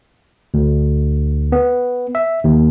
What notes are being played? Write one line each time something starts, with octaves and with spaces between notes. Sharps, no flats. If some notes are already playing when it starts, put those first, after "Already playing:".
D2
B3
E5
D#2